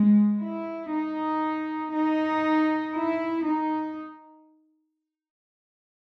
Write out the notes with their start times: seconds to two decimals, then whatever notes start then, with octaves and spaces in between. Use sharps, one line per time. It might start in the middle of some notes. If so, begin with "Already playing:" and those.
Already playing: G#3
0.40 E4
0.92 D#4
1.93 D#4
2.94 E4
3.45 D#4